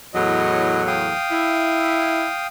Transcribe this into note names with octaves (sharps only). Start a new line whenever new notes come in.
E2 A2 F#3 D#5
F5 G5 D#6
E4